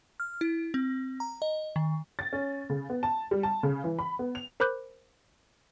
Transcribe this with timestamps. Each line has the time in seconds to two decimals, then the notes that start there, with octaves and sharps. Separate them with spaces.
0.20 F6
0.41 E4
0.74 C4
1.20 A#5
1.42 D#5
1.76 D#3
2.19 A6
2.33 C#4
2.70 C#3
2.90 B3
3.03 A5
3.31 G3
3.43 A5
3.63 C#3
3.84 E3
3.99 B5
4.19 B3
4.35 F7
4.60 A#4 C5 B5 D6 F#6 G6